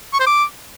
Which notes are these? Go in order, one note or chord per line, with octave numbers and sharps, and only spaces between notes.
C#6
C5
D6